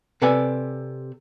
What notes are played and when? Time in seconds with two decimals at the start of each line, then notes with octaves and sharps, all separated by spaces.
0.22 C3 A4 B4 D5 G#5